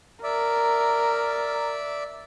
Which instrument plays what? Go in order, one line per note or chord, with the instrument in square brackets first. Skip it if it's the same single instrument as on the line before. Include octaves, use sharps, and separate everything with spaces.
[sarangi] A#4 [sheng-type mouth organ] D5 E5